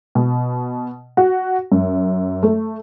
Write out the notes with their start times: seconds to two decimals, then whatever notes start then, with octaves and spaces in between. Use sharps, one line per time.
0.15 B2
1.17 F#4
1.72 F#2
2.43 A3